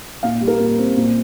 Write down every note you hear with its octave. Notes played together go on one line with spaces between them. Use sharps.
A#2 F5
G3
A#4
A#2
C4
A#2